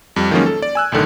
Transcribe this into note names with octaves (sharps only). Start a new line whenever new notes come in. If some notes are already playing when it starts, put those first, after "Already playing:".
F2 G3
D#3 F3 F#3 G#3 A#3 C#4
A4
D5
G#5 E6 F#6
B1 A2 D3 D#3